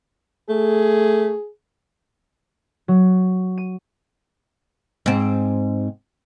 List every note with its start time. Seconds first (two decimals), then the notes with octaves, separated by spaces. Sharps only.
0.49 A3 G#4
2.88 F#3
3.58 D#7
5.06 G#2 C4